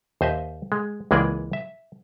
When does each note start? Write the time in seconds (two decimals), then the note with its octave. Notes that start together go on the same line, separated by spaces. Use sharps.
0.21 D#2 C5 D#5 E5
0.72 G#3
1.11 C#2 E3 G#3 A#3 G#4 D5
1.53 E5